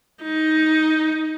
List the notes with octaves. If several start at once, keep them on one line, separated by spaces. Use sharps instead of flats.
D#4